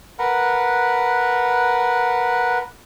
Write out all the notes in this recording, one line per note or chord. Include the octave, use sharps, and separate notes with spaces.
A#4 B4 F#5